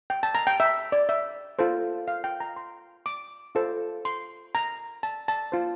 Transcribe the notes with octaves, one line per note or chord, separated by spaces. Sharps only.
G5
A5
A#5
G5
E5
D5
E5
F4 A4 C5
F5
G5
A#5
C6
D6
F4 A4 C5
C6
A#5
A5
A5
F4 C5